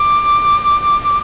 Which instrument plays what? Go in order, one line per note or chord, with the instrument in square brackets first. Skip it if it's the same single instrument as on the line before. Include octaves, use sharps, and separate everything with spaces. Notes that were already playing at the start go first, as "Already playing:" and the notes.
Already playing: [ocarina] D6